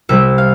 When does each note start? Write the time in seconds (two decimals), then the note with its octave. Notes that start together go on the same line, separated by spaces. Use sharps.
0.09 C2 C3 G3 E5
0.38 F5